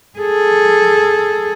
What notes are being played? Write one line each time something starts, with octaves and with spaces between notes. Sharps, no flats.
G#4 A4